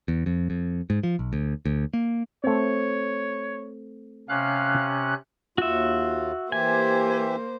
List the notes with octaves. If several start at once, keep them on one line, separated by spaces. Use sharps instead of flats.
E2
F2
F2
G#2
F3
B1
D2
D2
A#3
A3 C4 C#5
C3 C#4 F5 F#6
D#2 F4 F#4 E5
E3 A#3 G4 C5 E5 G#5